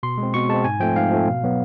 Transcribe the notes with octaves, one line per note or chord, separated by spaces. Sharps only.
B2 C6
G#3
C4
B2 C#6
G#3 C4 A5
G#2 G#5
F3 A3 C4 G5
G#2 F5
F3 A3 C4
B2
F#3 B3